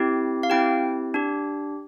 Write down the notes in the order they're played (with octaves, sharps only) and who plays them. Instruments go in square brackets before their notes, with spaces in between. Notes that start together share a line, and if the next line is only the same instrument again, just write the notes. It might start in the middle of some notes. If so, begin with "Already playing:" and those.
Already playing: [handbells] C4 E4 G4
F5
C4 E4 G4 G5
D4 G4